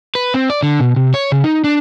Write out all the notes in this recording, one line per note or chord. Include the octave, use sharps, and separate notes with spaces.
B4
C4
D5
D3
B2
C3
C#5
C#3
D#4
D4